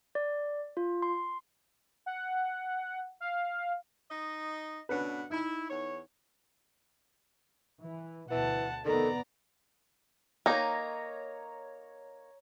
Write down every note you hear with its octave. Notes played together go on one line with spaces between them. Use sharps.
D5
F4
C6
F#5
F5
D#4 D#5
B2 D3 C#4 D4 B4 F#5
D#4 E4
E2 C#5
E3
D2 B2 E3 F#5 A5
F1 D#3 B3 A4 D5 A#5
A#3 D#4 C#5 A#5